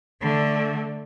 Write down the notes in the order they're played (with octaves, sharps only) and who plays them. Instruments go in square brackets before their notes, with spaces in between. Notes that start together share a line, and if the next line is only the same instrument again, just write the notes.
[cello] D3 A3